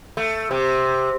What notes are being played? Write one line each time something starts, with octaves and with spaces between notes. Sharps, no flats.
A3
C3